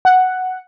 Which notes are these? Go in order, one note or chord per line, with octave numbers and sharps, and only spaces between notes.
F#5